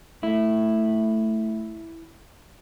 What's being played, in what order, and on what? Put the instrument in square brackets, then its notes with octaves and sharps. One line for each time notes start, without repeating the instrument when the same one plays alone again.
[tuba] A3 [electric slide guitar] E4